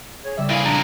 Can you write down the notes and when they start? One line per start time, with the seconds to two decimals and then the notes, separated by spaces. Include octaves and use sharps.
0.24 G#4 C#5
0.37 C#3 G3 E5 E6
0.49 A#2 E4 G#4 F5
0.65 F2 A#2 D4 A#5 A6 A#6